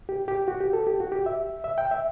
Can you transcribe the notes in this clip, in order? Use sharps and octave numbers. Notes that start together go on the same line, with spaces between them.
G4
G4
F#4
G4
A4
G4
F#4
G4
E5
E5
G5
E5